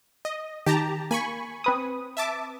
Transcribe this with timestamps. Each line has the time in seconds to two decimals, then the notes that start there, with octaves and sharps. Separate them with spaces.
0.25 D#5
0.66 D#3 G4 A5 A#5
1.11 A#3 G#5 B5 C#6
1.64 C4 B4 D#6
2.17 E5 A5 D6